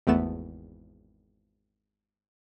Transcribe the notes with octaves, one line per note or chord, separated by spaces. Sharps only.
G#1 E2 A3 B3 E7